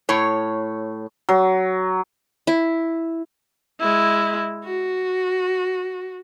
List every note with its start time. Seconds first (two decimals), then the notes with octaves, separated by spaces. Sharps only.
0.09 A2 C#5
1.29 F#3
2.47 E4
3.80 G#3 E4
4.64 F#4